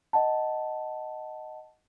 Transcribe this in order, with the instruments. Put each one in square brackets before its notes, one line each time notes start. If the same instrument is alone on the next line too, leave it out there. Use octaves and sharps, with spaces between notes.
[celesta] D#5 F#5 A5